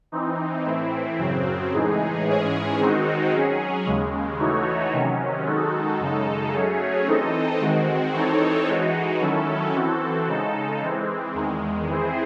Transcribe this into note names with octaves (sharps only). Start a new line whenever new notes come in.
E3 C4 D#4
A2 E3 C4 E4
F#2 C#3 F#3 C4
A2 E3 G#3 D#4 G#4
G#2 E3 G#3 C#4 G#4
D#3 G#3 C4 D#4 F#4
F#3 C#4 G#4
D#2 C#3 G#3
E3 A3 D#4 F#4 C#5
C3 D#3 F#3 C#4
D#3 G#3 D#4 F#4 A4
F#2 C#3 G#3 D#4 A4
F#3 A3 C#4 G#4 C#5
E3 C4 D#4 A4 D#5
D#3 G#3 C4 F#4
E3 C4 D#4 A4 C#5
E3 G#3 D#4 F#4
D#3 F#3 C#4 E4 A4
E3 C4 F#4 A4
C#3 G#3 D#4 A4
E3 G#3 C4
E2 D#3 G#3
E3 C4 E4 G#4 C5